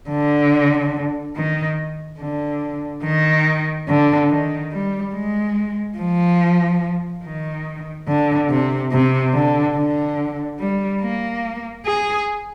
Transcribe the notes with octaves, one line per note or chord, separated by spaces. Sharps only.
D3
D#3
D3
D#3
D3
D#3
G3
G#3
F3
D#3
D3
C3
C3
D3
D3
G3
A#3
G#4